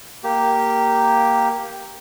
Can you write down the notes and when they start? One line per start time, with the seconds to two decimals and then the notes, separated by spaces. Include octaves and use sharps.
0.24 A#3 G4